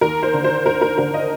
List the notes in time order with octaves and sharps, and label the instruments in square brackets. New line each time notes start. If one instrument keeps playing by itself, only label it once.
[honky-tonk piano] D#2 A#4
C5
D3
C5
D#2 A#4
A#4
D3 A#4
D#5